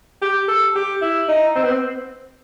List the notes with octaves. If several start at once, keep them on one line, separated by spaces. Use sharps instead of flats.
G4
A4
G4
E4
D#4
C4
B3
C4